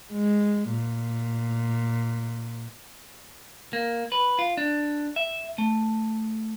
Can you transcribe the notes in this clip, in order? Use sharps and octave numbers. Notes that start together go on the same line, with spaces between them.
G#3
A#2
A#3
B4
F4
D4
E5
A3